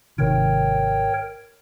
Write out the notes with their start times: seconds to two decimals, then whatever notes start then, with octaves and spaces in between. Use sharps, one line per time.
0.18 G#1 C3 D#3 A#4 C#5 G5